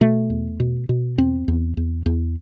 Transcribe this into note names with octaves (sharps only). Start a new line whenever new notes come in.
B2 A3
E2
B2
B2
E2 C4
E2
E2
E2